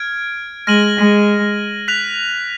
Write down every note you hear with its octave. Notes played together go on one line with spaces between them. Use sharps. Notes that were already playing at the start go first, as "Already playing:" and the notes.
Already playing: F6 G#6 D7
G#3 F6 A#6 D#7 F#7
G#3
F#6 B6 F7